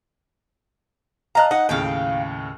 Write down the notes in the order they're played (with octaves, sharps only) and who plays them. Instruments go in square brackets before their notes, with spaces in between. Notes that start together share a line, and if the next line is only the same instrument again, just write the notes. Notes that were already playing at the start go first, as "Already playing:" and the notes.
[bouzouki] D#5 A#5 [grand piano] F5 A5 F#6
[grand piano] D#4 D#5 [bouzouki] F#5
[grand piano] D#2 A2 C#3 [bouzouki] F5 G5